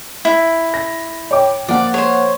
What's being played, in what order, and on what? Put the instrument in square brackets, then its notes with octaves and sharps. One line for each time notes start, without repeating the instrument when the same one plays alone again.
[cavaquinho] E4
[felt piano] A#6
C#5 G5 D6
[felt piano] F3 A#3 F#5 [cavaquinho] D5
[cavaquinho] C5 C#5